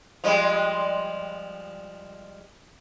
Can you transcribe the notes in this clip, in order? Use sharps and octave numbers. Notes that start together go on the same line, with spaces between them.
F3 G3 G#3